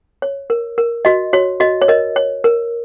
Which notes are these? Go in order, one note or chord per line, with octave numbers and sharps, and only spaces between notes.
C#5
A#4
A#4
F#4 D#5
F#4 C#5
F#4 D#5
C#5
A#4 D#5
C#5
A#4